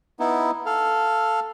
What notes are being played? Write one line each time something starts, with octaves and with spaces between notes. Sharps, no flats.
B3 D#4 E4
A4 F5